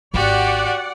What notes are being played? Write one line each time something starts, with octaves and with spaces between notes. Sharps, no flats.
G#1 F#4 G4 D5 F#5